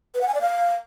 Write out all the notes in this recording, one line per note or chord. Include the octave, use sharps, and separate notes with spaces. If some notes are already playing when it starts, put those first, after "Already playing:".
B4
F#5
G#5
D5
F5